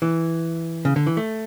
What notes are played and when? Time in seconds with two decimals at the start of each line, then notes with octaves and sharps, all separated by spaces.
0.02 E3
0.85 C#3
0.96 D3
1.07 E3
1.17 A3